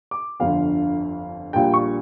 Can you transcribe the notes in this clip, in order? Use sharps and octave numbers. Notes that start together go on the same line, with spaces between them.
D6
G1 F2 D3 F5
A#1 A#2 G3 G5
C#6